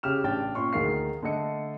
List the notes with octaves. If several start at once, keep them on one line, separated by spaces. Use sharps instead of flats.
C#3 G4 F6 E7
A1 C#3 D4 G5 A6
A#2 C#4 C6 C#6
D2 D#3 G#4 A#4 F5 C7
D3 A3 A4 D#5 C#7